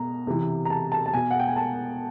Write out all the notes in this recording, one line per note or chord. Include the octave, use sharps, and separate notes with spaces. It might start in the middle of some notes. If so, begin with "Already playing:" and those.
Already playing: B2 A#5
C3 E3
A#5
A5
A5
A5
B2 G#5
F#5
G5
G#5
A5